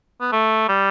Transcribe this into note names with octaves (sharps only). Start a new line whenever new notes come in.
B3
A3
G3